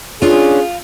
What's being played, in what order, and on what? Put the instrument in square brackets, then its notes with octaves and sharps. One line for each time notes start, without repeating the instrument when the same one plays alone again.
[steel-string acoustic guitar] C#4 D4 [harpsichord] F4 [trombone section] G#4